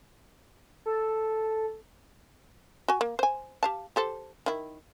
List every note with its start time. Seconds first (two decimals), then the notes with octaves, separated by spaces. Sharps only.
0.86 A4
2.88 F#4 G#5
3.01 A#3
3.19 C5 G#5
3.63 G4 F5 A5
3.96 G4 A4 C5
4.46 D#3 E4